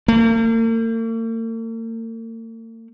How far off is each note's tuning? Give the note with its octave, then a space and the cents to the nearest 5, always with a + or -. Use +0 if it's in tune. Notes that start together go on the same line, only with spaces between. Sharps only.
A#3 -45